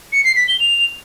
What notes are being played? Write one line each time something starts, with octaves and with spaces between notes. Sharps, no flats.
C#7
C7
B6
G7
F7